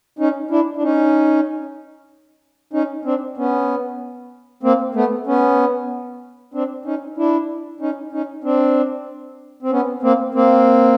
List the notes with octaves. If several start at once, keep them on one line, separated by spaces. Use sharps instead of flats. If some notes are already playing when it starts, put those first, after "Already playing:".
C#4 D#4
D4 E4
D4
C#4 D#4
C#4 D#4
C4 D4
B3 C#4
A#3 C4
A3 B3
B3 C#4
C4 D4
C#4 D#4
D4 E4
C#4 D#4
C#4 D#4
C4 D4
C4
B3 C#4
A#3 C4
A#3 C4